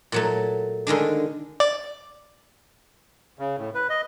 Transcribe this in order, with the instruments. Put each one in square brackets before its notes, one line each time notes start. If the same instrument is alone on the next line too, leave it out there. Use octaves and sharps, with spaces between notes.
[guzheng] A#2 F#3 A3
D3 D#3 G#3 D4
[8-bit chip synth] D5
[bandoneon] C#3
A2
B4
D#5